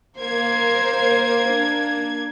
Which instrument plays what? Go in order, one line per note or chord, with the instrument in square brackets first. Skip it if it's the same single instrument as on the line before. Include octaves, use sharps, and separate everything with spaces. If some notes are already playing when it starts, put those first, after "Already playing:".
[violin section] A#3 G#6 [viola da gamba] C5
[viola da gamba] D4